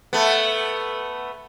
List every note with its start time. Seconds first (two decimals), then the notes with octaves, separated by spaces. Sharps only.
0.13 A3 B3